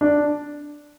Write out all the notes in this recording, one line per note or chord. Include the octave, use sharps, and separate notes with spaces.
D4